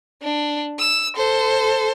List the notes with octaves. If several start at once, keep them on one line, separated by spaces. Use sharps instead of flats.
D4
E6
A4 C5